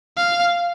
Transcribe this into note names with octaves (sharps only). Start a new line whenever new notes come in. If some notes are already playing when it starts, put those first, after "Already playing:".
F5